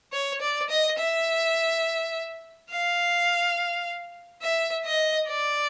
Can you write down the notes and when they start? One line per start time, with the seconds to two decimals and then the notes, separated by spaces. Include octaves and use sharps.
0.13 C#5
0.41 D5
0.70 D#5
0.99 E5
2.70 F5
4.42 E5
4.85 D#5
5.28 D5